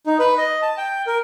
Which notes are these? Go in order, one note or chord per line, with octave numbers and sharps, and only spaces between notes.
D#4
B4
D#5
A5
G5
A#4